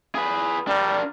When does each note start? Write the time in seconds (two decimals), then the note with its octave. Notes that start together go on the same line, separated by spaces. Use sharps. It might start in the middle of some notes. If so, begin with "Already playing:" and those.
0.15 G#4 B4
0.67 G3 D4 A#4